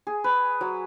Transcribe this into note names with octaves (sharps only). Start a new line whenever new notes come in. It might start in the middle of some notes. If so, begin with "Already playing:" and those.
G#4
B4
F#3